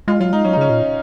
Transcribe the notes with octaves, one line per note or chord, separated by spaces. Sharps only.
G#3 F4
F#3 F4
G#3 D#4
F#3 C#4
D#4
C#3 C#4
A#2